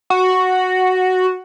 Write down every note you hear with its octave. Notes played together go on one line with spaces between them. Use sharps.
F#4